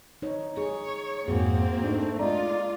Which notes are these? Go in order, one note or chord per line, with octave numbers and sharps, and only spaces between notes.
D#4 C#5
G#4 C#5
F2 G#2 A#3 C4 F#4 G#4
A3 D4 D#4
G#3 F4 D5 D#5 A#5